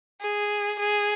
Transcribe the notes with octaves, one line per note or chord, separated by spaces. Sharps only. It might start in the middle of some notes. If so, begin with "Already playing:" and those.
G#4
G#4